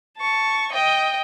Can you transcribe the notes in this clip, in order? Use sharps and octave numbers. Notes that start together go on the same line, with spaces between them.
A5 C#6
D#5 G5